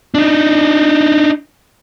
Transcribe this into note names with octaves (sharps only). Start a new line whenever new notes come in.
D4 D#4